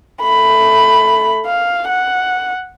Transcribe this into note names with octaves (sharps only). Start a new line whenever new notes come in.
A3 B5
F5
F#5